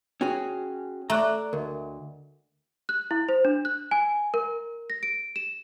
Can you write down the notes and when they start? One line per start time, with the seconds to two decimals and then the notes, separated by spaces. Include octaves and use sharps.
0.21 C#4 F#4 G#4 G5
1.10 A3 D5 E5 A#5 F#6
1.53 D2 A#4 D#5
2.89 F#6
3.11 E4
3.29 C5
3.45 D4
3.65 F#6
3.91 G#5
4.34 A#4
4.90 A#6
5.03 D7
5.36 E7